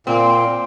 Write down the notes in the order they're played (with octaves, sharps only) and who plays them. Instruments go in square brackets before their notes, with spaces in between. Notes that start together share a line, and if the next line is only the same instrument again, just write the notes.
[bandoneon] A#2 [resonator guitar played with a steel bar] C4